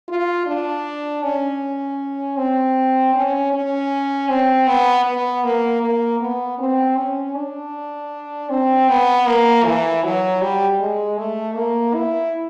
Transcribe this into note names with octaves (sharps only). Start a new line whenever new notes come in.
F4
D4
C#4
C4
C#4
C#4
C4
B3
B3
A#3
A#3
B3
C4
C#4
D4
C4
B3
A#3
E3
F#3
G3
G#3
A3
A#3
E4